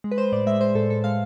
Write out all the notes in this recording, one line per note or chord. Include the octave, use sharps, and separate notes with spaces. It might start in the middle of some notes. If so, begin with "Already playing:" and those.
G#3
B4
G#3 C5
A2 D5
G#3 E5
G#3 C5
A2 A4
A2 A4
G#3 F5